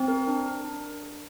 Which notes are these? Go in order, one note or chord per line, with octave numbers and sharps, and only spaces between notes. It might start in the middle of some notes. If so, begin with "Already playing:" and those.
Already playing: C4
A#4
D4
A#4
D4
D4
A#4